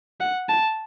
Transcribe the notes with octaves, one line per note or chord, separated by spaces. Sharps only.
F#5
A5